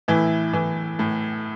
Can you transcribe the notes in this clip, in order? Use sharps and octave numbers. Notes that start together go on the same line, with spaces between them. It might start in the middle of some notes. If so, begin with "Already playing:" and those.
A2 E3 E4
E3
A2